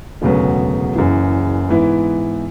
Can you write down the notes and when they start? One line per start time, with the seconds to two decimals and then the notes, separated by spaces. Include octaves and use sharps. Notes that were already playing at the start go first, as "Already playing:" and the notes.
0.22 E1 D2 C#3 F#3 B3
0.95 F#1 F#2 C#3 E3
1.69 G#2 E3 B3 E4